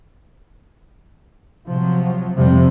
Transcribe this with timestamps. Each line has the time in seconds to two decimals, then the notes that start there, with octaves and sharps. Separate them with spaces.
1.68 C3 F3 F#3
2.37 F2 C3 F3 G3